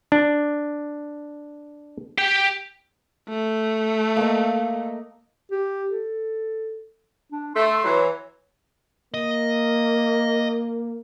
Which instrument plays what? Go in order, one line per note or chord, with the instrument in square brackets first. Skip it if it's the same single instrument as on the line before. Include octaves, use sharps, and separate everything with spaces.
[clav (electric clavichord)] D4
[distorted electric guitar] G4 G5
[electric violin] A3
[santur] A#3 D#5
[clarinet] G4
A4
D4
[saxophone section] A3 [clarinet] C6
[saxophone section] E3 F#3
[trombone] A#3 [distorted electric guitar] D#5